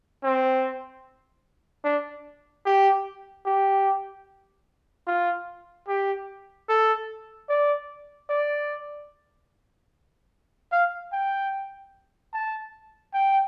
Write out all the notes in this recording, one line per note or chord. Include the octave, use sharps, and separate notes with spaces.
C4
D4
G4
G4
F4
G4
A4
D5
D5
F5
G5
A5
G5